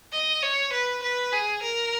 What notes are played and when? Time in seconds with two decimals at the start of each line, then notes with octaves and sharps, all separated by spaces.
0.12 D#5
0.42 C#5
0.72 B4
1.03 B4
1.32 G#4
1.62 A#4